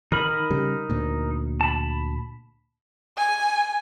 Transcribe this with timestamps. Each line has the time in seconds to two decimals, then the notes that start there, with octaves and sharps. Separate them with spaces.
0.12 D#3 D#4 A#4 B5
0.50 C#3 G3
0.90 D2 A#2
1.61 A5 B5
3.17 G#5